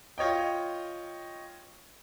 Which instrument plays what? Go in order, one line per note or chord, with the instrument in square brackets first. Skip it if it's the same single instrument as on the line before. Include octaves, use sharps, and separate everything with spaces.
[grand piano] F4 C#5 D#5 G5